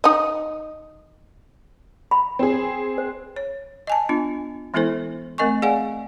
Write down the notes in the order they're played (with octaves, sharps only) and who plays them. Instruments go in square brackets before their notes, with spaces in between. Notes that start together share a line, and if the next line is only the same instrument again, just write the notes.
[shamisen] D#4 D#5
[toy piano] B5
[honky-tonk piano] C4 G#4
[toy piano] C5
[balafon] C#5
D#5 G#5 A5
B3 D4 F4
E3 G#3 B3 E4 A4 C5
A3 C4 A#4 D#5 G#5 C#6
G#4 D5 F5 F#5 G#5